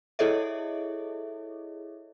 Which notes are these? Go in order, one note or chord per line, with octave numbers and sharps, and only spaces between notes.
E4 G#4 A4 C#5 D#5 E5